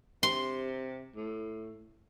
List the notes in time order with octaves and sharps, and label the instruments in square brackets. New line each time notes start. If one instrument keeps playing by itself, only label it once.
[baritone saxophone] C3 [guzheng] C6
[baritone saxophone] A2